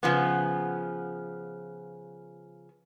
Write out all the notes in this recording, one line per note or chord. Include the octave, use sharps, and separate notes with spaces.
C#3 F3 B3